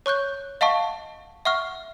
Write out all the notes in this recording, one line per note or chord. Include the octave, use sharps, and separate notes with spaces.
C#5 C#6 F#6 G6
D#5 F5 F#5 A5 C#6
E5 F#5 C#6 F6